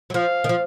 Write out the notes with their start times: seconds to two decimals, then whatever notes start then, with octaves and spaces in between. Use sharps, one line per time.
0.10 F#3
0.14 F3 F5
0.44 D#3
0.49 F3